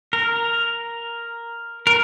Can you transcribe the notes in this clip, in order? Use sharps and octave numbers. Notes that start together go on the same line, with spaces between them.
A#4
A#4